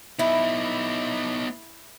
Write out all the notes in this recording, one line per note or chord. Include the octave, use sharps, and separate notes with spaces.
B3 D#4 E4